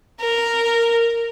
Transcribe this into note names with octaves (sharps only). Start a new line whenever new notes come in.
A#4